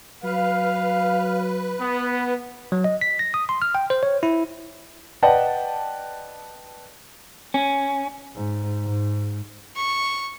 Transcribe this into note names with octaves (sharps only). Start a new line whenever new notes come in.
F#3 B4 F5
B3
F#3
D#5
B6
A#6
D#6
C6
F6
G5
C5
C#5
E4
B4 D5 D#5 F#5 G5 A5
C#4
G#2
G#2
C#6